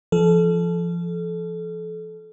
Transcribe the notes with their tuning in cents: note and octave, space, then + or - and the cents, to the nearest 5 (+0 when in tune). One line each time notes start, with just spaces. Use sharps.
F3 -30 A4 -30